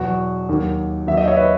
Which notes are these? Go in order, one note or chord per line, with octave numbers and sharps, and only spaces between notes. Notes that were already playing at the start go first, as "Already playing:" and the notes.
Already playing: E2 B2 F#3 F#4
D#2 D#3 F#3
D#2 D#3 F#3 E5
D#5
C#5 E5
B4 D#5